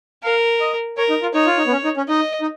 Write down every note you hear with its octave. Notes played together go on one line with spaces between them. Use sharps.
A#4 F5
D#5
A#4 C#5
D#4
F4
D#4 C#5
F4
D#4
B3
C#4
D#4
C#4
D#4 D#5
D#4